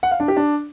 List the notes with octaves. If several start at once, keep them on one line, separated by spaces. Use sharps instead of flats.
F#5
F5
D4
G4
D4